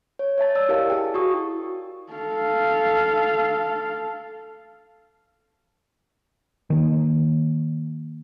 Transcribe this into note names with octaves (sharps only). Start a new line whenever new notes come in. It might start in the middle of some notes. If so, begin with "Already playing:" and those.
C#5
C#5 E5 A5 A6
D5 A5 E6
E4 G4 A#4 D#5 F5 A5
E4 G#4 G5
F#4 C#6 D#6
A4 F5
D#3 A#3